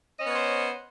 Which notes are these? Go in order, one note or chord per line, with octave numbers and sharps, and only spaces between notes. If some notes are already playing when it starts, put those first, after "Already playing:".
B3 C#4 C5 C#5 D#5